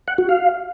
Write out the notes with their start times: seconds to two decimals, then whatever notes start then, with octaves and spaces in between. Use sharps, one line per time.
0.08 F#5
0.18 F#4
0.29 F5